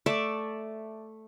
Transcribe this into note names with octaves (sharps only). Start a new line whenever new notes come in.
A3 D5 E5 A5